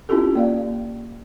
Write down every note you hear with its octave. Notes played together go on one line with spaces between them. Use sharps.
C4 C#4 E4 F4 G4 A4
A#3 D5 F5